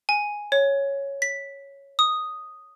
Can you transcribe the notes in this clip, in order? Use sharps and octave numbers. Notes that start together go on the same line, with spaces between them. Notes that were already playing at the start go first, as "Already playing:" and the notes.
G#5
C#5
B6
D#6